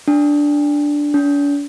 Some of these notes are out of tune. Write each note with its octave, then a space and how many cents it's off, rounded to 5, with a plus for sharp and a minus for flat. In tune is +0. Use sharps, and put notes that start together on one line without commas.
D4 -5
D4 -45